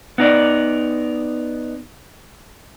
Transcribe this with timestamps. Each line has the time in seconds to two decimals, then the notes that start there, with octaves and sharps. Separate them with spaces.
0.18 B3 D#4 D5